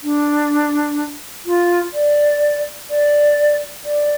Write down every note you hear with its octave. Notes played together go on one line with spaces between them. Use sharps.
D4
F4
D5
D5
D5